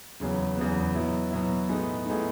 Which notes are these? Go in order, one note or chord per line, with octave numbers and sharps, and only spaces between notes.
E2 C#3 F#3 B3
E2 C#3 F#3 B3
B2 F#3 B3 E4
B2 F#3 B3 E4
A2 G#3 B3 D#4
A2 G#3 B3 D#4